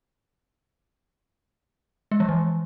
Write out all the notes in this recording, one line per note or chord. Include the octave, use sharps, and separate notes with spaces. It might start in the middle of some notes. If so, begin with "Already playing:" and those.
G#3
F3
E3